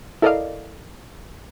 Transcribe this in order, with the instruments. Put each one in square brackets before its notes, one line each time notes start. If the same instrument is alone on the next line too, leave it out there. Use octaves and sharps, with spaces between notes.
[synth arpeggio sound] E4 A4 A#4 D5 D#5 F5